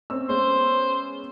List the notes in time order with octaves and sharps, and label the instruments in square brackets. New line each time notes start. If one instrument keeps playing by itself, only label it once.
[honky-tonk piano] C4 C#4 E6
[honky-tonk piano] G#3 B3 C#4 [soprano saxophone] C5